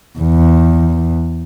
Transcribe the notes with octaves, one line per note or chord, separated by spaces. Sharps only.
E2